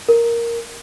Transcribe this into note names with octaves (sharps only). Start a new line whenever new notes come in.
A#4